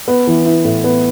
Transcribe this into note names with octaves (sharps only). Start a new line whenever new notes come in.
B3
E3
E4
A2
B3